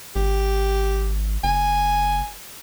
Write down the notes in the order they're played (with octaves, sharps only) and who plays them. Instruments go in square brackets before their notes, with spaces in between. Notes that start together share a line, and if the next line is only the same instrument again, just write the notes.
[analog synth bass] G#1 [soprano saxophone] G4
[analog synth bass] F#1 [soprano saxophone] G#5